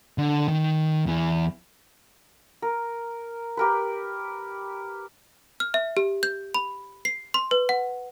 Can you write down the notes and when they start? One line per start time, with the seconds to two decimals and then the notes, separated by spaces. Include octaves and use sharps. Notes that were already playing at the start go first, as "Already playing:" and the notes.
0.18 D3
0.48 D#3
1.06 E2 E3
2.62 A#4
3.57 G4 A#4 B4
5.60 F6
5.74 E5
5.97 G4
6.23 G6
6.54 B5
7.05 C7
7.34 C6
7.51 B4
7.69 F#5